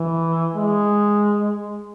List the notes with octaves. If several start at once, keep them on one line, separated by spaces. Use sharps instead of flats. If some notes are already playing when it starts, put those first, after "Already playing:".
Already playing: E3
G#3